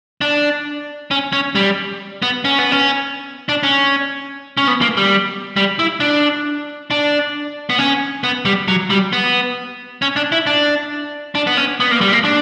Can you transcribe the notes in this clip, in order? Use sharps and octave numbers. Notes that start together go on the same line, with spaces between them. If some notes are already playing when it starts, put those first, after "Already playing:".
D4
C#4
C#4
G3
B3
C#4
B3
C#4
D4
C#4
C#4
B3
A#3
G3
G3
E4
D4
D4
B3
C#4
B3
G3
F#3
G3
B3
C#4
D4
E4
D4
D4
B3
C#4
B3
A#3
G3
A#3
D4